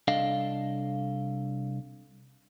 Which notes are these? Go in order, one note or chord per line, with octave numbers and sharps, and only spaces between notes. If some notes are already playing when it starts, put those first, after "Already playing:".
C2 D4 A4 D#5 F5